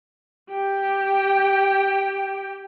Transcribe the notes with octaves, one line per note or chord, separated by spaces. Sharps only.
G4 G5